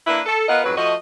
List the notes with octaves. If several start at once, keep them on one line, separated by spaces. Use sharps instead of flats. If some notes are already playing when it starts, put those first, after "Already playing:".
A#3 D4 E4 B4
A4
B3 F4 A#4 B4 D#5 F#5
F2 G#2 F#3 B4
F3 A3 F#4 D#5